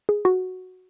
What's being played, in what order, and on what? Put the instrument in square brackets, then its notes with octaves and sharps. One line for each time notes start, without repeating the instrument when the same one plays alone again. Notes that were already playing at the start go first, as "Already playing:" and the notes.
[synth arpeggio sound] G#4
F#4